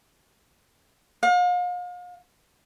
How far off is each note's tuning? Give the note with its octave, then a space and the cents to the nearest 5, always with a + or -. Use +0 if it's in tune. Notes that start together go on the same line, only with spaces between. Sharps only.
F5 +40